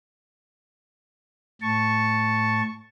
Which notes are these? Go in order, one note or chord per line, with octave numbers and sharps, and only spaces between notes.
A2 A5 C#6